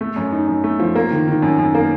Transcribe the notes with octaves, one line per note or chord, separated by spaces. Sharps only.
A3
F#2
D#4
F#2
A3
F3
A#3
D#3
D#3
F#2
F#2
A#3